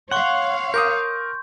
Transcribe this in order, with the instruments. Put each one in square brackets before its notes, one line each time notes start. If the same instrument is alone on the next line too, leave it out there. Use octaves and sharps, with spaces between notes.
[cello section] C#5 F5 [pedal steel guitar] F#5 [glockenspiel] C6 C#6
[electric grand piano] A#4 D6 D#6 [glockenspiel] G6